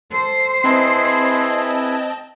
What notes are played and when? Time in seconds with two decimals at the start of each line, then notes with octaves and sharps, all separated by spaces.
0.11 A4 C5
0.64 C4 E4 G#4 B4 D#5 A5